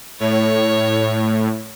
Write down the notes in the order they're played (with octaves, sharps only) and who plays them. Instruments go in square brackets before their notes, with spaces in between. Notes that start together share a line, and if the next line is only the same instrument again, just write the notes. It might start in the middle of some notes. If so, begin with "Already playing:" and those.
[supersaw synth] A2 [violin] C#5